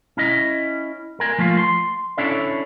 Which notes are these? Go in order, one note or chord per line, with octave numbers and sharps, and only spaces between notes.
C#4 E4 D#5
A#4 G#5
F3 A3 A#3 F4
C6
C#4 D4 E4 A4 C#5 D5